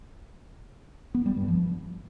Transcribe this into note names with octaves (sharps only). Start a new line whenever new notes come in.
B3
G3
G2
F3